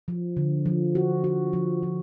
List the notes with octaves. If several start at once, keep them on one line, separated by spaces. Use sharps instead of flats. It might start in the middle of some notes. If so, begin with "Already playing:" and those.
F3
D3
F3
F#4
F#4
F3
F3